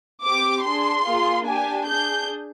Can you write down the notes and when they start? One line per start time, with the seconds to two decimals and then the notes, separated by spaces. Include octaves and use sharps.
0.24 C4 G4 D6
0.65 D4 G#4 C6
1.07 A#3 F4 G#4
1.46 D4 G4 G#5
1.87 D4 G#4 G6